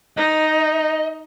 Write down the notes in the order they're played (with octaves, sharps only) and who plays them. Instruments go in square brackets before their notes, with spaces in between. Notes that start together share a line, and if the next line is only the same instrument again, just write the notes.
[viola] D#4 [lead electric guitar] D#5